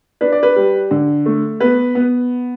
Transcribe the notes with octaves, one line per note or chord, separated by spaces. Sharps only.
D4 B4
D5
B4
G3
D3
A3
B3 B4
B3